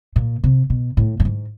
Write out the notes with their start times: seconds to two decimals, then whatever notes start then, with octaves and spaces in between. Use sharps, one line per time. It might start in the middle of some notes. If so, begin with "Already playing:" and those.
0.16 A#2
0.44 C3
0.70 B2
0.97 A2
1.20 G2
1.25 G#2